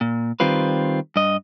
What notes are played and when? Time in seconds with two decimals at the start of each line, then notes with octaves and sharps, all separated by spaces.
0.01 A#2
0.40 D#3 G3 C4 F4 B4
1.16 G2 D#5